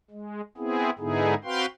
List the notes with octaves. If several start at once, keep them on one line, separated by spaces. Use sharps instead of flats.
G#3
B3 C4 E4 G#4
G#2 D3 B3 D#4 E4 G#4
C4 F#4 B4 F5 G5 C6